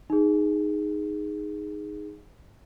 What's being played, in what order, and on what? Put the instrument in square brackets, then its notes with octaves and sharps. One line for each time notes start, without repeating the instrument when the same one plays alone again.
[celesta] D#4 G#4